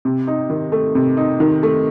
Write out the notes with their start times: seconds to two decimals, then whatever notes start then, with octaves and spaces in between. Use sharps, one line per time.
0.05 C3
0.27 D#4
0.50 D#3
0.72 A3
0.95 C3
1.17 D#4
1.40 D#3
1.63 A3